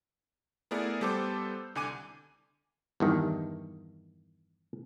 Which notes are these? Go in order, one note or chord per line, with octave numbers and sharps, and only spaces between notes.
A3 B3 E4 G#4 A#4 D5
G3 B3 A4 C5 D6
C2 D3 G#5 D6 D#7
E2 G2 D#3